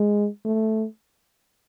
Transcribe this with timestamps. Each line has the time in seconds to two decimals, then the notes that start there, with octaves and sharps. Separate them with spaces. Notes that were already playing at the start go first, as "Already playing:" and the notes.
Already playing: G#3
0.45 A3